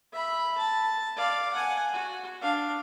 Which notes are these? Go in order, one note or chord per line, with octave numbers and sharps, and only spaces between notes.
E5 B5
A5
D5 F5
F#5 G#5
F#4
D4 F5